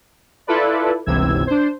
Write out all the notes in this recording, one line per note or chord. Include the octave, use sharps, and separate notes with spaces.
E4 F4 A4 B4 D5
G1 C#2 C3 E3 E6 G#6
D4 C5